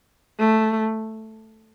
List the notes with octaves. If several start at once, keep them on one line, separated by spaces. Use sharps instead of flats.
A3